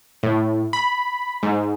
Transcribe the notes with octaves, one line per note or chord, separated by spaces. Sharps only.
A2
B5
G#2